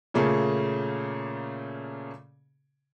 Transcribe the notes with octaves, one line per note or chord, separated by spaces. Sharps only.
A#2 C#3 A3 A#3 G#4